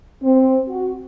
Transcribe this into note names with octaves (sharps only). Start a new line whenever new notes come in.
C4
F#4